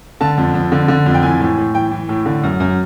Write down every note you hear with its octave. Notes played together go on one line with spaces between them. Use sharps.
D3 A5
F2
F2
D3
D3
F2
G5
E3 G#5
A2
A2
E3 G5
E3
A2
D3
F#2
F#2